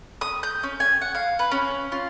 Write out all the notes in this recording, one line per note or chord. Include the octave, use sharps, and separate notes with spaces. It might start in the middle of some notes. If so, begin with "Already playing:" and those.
D#6
G6
C#4
G#5
F#5
F5
B4
C#4
F4